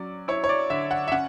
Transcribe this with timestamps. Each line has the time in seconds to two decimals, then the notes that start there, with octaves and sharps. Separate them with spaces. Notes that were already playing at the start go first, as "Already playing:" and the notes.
Already playing: F#3 C#4 D5
0.28 E4 C#5
0.44 C#5
0.49 D5
0.70 D3 E5
0.91 F#5
1.08 E5
1.12 C#4 F#5